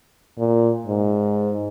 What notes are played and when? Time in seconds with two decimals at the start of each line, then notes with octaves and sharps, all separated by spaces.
0.38 A#2
0.87 G#2